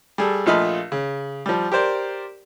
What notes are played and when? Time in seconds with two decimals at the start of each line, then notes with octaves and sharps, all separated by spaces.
0.18 G3 G#4 A4
0.46 A#1 A3 F4 D#5 B5 F6
0.92 C#3
1.46 F3 G3
1.72 G4 A#4 C5 D5